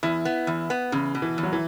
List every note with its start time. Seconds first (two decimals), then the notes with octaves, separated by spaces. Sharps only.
0.03 E2 E4
0.25 B3
0.47 E2
0.70 B3
0.92 E2 C#3
1.15 B2
1.22 E3
1.38 E2
1.43 F#3
1.53 E3